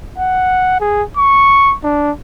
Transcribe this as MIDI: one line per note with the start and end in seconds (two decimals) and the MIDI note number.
0.18 0.76 78
0.80 1.03 68
1.17 1.75 85
1.84 2.11 62